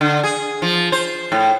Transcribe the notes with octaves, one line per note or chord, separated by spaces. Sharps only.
D3
G#4
F3
C5
A2